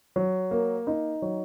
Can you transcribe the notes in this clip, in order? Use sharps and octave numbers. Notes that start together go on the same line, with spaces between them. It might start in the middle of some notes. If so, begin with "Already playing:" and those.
F#3
A#3
D#4
F#3